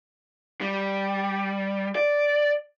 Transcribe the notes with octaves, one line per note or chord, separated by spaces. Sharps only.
G3
D5